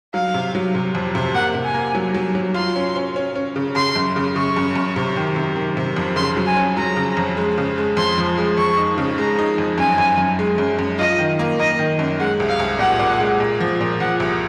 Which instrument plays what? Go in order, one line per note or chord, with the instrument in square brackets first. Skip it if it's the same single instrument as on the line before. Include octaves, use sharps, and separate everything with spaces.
[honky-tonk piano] F#3 [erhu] F5
[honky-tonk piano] C3
F#3
C3
F2
C3
[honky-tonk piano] A#3 [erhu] F#5
[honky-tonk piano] C3
[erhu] G#5
[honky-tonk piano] A#3
F#3
F#3
F#3
[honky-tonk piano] F4 [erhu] C6
[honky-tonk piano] C#4
C#4
C#4
C#4
C#3
[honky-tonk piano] C#3 [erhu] C6
[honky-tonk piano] F#2
C#3
[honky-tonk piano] C#3 [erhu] C#6
[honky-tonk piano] F#2
F#2
C3
D#3
C3
D#3
C3
F2
[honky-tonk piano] C#3 [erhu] C6
[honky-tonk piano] F#3
[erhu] G#5
[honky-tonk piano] C#4
[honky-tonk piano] F#3 [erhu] A#5
[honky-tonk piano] C#3
F2
G#3
C#3
G#3
[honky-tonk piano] F2 [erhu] C6
[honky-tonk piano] F3
G#3
[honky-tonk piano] F2 [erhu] C#6
[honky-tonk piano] D#4
C#3
[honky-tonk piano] G#3 [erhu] A#5
[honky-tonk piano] D#4
F2
[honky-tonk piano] F#2 [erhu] G#5
[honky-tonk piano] F#2
F#2
G#3
F#2
F#2
[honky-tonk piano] F4 [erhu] D#5
[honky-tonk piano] D#3
A#3
[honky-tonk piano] A#3 [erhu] D#5
[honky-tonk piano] D#3
F#2
[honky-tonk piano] G#3 [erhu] F#5
[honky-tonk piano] C2
[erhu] F5
[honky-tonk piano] C2
[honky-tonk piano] A#2 [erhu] F#5
[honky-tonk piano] A#2
G#3
A#2
F3
A#2
[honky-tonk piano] F3 [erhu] F#5
[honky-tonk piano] C2